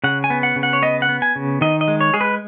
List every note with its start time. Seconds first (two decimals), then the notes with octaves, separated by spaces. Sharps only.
0.04 C#3 F#5
0.24 G#5
0.30 B3
0.43 F#5
0.56 C#3
0.63 F#5
0.73 C#5
0.82 B3 D#5
1.02 F#5
1.09 B3
1.22 G#5
1.36 C#3
1.61 D#3 D#5
1.81 D#5
1.88 G#3
2.01 C#5
2.14 G#3 G#4
2.21 B4